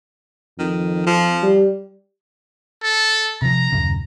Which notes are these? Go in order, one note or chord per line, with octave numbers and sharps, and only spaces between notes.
F2 D#3
F3
G3
A4
C3 F3 A#5
D#1 F#2 C#3